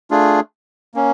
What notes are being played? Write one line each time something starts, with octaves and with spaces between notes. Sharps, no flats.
A3 D4 F4 G#4
A#3 C#4